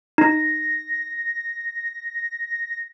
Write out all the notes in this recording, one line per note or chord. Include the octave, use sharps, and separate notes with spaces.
D#4 A#6